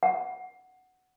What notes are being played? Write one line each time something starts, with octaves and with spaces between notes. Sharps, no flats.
F#5